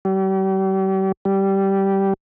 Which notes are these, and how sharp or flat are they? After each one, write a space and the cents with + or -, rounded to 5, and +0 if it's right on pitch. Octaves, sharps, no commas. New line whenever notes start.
G3 -40
G3 -10